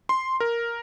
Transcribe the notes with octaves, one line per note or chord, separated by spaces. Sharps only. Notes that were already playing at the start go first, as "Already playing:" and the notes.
C6
A#4